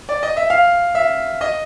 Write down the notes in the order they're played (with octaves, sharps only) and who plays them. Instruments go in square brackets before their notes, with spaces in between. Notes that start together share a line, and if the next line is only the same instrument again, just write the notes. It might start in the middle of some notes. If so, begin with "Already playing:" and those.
[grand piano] D5
D#5
E5
F5
E5
D#5